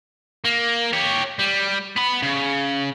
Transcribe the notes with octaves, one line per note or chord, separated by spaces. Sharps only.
A#3
G4 C#5
G3
B3 B5
C#3